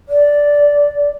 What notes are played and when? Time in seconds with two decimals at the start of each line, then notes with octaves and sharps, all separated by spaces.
0.09 D5